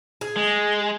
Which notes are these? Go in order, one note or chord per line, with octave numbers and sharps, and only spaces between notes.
G#4
G#3